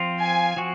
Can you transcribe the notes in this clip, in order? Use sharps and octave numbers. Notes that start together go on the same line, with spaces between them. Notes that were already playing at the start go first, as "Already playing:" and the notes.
Already playing: F3 C4 F4
G#5
F3 C4 F#4